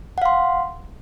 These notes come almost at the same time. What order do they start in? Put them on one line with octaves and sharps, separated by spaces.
F#5 F5 C6